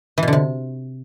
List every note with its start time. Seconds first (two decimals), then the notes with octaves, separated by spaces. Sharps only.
0.18 E3
0.23 B2
0.28 D3
0.33 C3